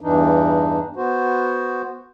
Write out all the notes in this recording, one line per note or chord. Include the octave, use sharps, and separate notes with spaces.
E2 G2 E3 D4 D#4
B3 F#4 C5